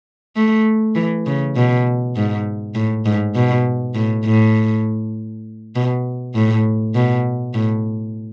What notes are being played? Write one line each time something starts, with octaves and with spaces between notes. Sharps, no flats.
A3
E3
C#3
B2
G#2
A2
G#2
B2
A2
A2
B2
A2
B2
A2